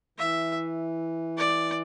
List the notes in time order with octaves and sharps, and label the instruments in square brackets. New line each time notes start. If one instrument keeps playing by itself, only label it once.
[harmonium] E3 [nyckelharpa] E5
[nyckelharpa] D5